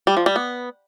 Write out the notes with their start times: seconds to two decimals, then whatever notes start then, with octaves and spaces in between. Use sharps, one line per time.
0.07 G3
0.17 F3
0.26 G3
0.36 B3